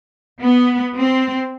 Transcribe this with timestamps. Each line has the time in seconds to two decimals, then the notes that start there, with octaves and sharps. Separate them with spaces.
0.41 B3
0.96 C4